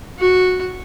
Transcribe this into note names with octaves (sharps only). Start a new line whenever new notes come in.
F#4